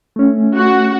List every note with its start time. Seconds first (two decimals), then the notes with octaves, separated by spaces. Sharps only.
0.16 A3 C#4
0.55 F#4